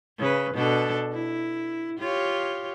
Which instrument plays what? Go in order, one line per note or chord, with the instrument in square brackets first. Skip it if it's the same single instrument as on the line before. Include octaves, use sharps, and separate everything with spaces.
[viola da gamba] C#3 B4
B2 D4 A4
E4
F4 G4 C#5